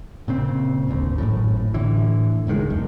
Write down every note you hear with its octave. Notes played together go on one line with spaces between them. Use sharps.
A#2 C#3 C4
D#1 G#1 D2
G#1 F#2 A2
A2 D3 E3
F#1 C#2 D#3 G#3
F#1 E2